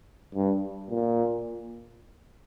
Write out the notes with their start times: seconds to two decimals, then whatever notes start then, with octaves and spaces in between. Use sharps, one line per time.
0.35 G2
0.90 A#2